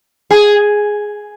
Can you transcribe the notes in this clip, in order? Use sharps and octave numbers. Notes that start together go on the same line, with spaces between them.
G#4